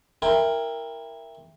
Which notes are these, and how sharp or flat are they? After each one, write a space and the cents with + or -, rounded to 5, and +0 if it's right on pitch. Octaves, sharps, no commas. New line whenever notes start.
E4 +5 A#4 +0 G5 +20